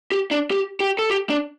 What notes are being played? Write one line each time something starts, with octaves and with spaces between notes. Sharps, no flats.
G4
D4
G4
G4
A4
G4
D4